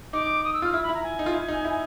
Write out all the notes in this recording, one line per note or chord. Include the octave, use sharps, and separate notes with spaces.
D#4 D6
D#6
E6
F4 F6
E4 E6
B5
E4
A#5
G#5
D#4
F4
E4
D#4
E4